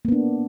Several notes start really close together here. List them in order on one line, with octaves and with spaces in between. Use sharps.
A#3 B3 D4